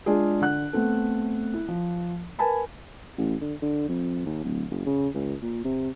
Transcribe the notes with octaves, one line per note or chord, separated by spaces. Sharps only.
G#3 D4 F4 G#4
D3 F#5 F#6
A3 B3 C4 A4
E4
F3
A#4 B4 G#5 A5 B5
A1
D3
D3
F2
D#2
D1
F#1
C#3
C#2
A#2
C3